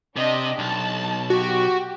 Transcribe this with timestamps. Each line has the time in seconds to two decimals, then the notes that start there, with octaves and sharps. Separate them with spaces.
0.16 C3 D4 G4 D#5
0.59 B1 A5
1.30 F#4 G4